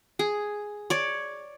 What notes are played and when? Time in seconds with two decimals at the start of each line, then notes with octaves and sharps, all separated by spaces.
0.19 G#4
0.90 C#5 D5